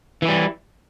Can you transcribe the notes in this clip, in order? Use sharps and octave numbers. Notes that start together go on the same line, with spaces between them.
E3 G3 E4